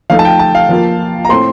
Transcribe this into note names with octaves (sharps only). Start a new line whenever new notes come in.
F3 A3 D#4 F5
A5
G5
A5
F5
F3 A#3 F4
A#5
A2 A3 C4 C6